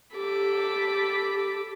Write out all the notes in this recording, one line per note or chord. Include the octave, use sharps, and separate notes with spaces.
G4 A4 B5 D6